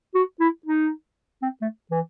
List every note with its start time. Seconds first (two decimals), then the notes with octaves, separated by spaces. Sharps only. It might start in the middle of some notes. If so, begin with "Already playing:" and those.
0.15 F#4
0.40 E4
0.66 D#4
1.42 C4
1.61 A3
1.91 E3